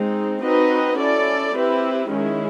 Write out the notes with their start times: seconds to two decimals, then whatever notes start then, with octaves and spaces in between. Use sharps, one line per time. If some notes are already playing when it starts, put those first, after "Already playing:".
Already playing: G#3 C4 D#4
0.41 C4 D#4 F#4 B4 D#5
0.97 C#4 E4 A4 D5
1.53 C4 E4 G4 B4
2.10 D#3 G#3 C#4 E4 G#4